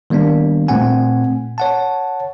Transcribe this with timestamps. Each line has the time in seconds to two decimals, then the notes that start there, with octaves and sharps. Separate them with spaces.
0.10 D#3 G3 A#3 B3 D4
0.68 A#2 A3 C4 F#5 G#5
1.58 C#5 F#5 A5